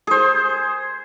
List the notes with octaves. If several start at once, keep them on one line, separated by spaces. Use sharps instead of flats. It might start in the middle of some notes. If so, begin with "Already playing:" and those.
G#4 C5